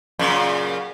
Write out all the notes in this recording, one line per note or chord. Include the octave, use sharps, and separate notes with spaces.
F#2 A#2 C#3